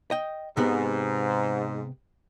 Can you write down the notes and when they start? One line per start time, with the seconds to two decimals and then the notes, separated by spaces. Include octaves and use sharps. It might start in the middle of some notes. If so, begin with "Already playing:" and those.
0.11 D#5 G5
0.57 G#2 C3 B3